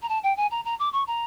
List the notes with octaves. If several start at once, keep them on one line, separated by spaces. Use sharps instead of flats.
A#5
A5
G5
G#5
A#5
A#5
D6
C#6
A#5